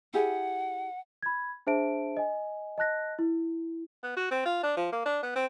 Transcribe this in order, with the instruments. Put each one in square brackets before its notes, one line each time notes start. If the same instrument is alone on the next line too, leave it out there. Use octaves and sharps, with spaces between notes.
[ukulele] E4 G4 G#4 [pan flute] F#5
[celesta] B5 G#6
D4 G#4 C5 E5 A5 D7
D#5 G#5
D#5 A5 F#6 A#6
E4
[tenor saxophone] B3
F#4
C4
F4
D4
F3
A#3
D4
B3
C4